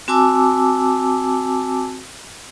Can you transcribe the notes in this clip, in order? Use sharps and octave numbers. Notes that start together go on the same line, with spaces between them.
C4 F#4 G#5 A5 D6 E6